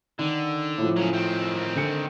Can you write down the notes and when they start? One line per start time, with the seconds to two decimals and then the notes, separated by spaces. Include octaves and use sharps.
0.19 D3 D#3
0.78 A2 F3
0.96 C#3 F#3
1.13 D#3 C4
1.76 D3 C#7